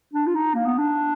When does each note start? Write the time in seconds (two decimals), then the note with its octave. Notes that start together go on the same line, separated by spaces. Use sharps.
0.13 D4
0.27 F4
0.35 D#4
0.54 A#3
0.66 B3
0.78 D4